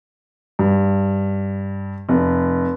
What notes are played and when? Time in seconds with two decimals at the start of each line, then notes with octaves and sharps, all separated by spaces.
0.59 G2
2.09 F1